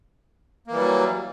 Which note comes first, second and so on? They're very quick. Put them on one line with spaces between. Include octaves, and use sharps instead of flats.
A#3 E3 G3 F#3